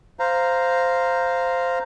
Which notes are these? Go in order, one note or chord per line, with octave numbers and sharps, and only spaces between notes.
C5 F5 A#5